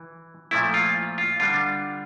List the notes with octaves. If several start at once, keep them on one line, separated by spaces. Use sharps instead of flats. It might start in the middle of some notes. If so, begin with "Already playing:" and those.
Already playing: E3
A#2 F3 A3 E4
F4
F4
D3 G3 D4 F4